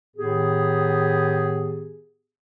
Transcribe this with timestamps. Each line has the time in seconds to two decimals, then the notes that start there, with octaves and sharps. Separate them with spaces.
0.17 A2 D#3 B3 G4 G#4